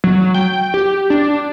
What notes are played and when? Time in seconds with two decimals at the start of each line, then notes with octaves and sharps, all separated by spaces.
0.04 F#3
0.34 G5
0.74 G4
1.10 D4